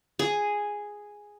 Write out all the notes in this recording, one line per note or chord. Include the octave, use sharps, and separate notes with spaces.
G#4